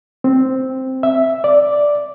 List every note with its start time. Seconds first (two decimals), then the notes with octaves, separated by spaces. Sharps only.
0.24 C4
1.03 E5
1.44 D5